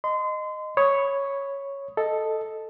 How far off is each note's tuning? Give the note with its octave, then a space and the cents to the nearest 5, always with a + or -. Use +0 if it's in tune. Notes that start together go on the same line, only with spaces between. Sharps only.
D#5 -10 C6 -30
C#5 +0 B5 +5 D#6 +15
A4 +0 D#5 +0